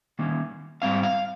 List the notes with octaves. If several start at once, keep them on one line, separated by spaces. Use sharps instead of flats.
D#3 A#3 C#4
G#2 G3 C4 F5
F5